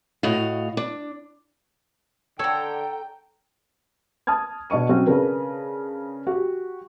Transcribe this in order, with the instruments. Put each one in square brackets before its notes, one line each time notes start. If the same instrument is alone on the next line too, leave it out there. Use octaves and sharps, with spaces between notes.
[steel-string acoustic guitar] A2 F#4 D#5 F5
D4
[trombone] D3 [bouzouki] A4 A#5 [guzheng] C#5 [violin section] G5
[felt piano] A5 D#6 F6 G#6
B2 D4 D#5 C#6 D#7
F#3 C4 C#4 F#4
C#3 D4 A#4 B4
F#4 G4